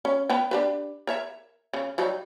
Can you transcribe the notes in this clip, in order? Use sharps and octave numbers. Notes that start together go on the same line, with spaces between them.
C#4
B3 B4 G5
D4 G4 B4
A#4 C#5 E5
C#3
F#3 G3 D#4